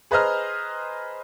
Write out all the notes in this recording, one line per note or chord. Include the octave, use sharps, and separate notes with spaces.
G#4 B4 C5 D#5 A#5 F6